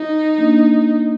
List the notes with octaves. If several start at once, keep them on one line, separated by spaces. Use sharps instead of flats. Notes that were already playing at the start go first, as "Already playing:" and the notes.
Already playing: D#4
A#3 D4